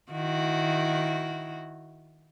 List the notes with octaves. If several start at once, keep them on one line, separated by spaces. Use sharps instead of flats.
D#3 E4 F#4